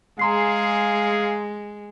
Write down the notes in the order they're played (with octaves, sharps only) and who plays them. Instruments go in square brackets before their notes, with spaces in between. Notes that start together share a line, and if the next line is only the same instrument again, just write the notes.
[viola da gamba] G#3 [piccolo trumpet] G#4 [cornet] F5 [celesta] A#5 C6 C7